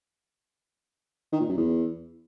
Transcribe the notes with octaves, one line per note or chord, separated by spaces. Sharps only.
D#3
A#2
F#2
E2